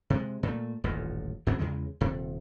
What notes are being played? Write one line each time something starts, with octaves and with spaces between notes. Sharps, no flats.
C3 G#3
A#2 A3
D#1 A1 F#2 A#2
F2 C3 F#3 B3
E2 C#3 G#3
D#1 C3